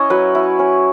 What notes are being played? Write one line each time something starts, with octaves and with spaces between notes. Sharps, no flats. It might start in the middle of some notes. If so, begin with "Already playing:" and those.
Already playing: C#4 E4 C#5 D#5
F#3 B4
E4
C#4